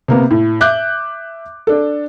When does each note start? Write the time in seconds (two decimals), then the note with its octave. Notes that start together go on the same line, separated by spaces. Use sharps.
0.08 C3 A#3 B3
0.31 A2
0.61 E5 D6 F#6 G6
1.67 D4 A4